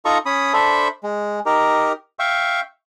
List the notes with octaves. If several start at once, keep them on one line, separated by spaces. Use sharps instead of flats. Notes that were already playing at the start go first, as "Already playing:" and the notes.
D#4 F4 A4 D#5 A#5 C#6
C#4 B5 D#6
D4 A4 C5 E5 B5
G#3
D#4 G4 A#4
E5 F5 G5 C#6